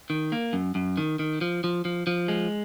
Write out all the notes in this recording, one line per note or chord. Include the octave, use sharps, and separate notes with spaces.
D#3
A#3
F#2
F#2
D#3
D#3
F3
F3
F3
F3
G#3